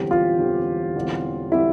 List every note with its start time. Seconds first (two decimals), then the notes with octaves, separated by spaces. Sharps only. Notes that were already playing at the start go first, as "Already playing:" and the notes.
Already playing: E1 E2 D3 G3 C4 G4
0.11 F4
0.39 E1 E2 D3 G3 C4
0.95 E1 E2 D3 G3 C4
1.52 D3 G3 C4 E4